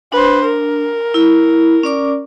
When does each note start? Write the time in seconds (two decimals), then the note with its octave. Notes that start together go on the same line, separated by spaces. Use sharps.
0.12 D4 B4 C5
0.44 A#4
1.14 E4
1.83 C#4 D5 D6